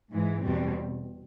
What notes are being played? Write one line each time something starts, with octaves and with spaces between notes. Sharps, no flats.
G#2 E3 G#3
E2 B2 G3 C4